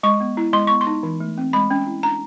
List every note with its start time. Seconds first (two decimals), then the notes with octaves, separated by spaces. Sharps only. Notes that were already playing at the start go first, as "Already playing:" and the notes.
0.03 G#3 C#6
0.20 B3
0.37 E4
0.53 G#3 C6
0.67 B3 C#6
0.81 C6
0.87 D#4
1.03 E3
1.20 A3
1.38 C4
1.53 G#3 B5
1.71 C#4
1.87 E4
2.03 D4 A#5